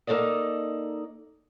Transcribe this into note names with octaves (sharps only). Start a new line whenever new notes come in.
A#3 D#4 A4 D5 D#5